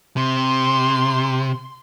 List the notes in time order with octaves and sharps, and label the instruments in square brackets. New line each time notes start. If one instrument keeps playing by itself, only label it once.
[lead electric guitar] C3 [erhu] C6